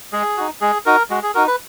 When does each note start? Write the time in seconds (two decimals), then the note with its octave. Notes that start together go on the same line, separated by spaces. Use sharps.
0.13 G#3 G#4
0.37 D#4 F#4
0.61 G#3 G#4
0.86 D#4 F#4 A#4
1.10 G#3 F#4
1.23 G#4
1.35 D#4 F#4 A#4
1.47 B4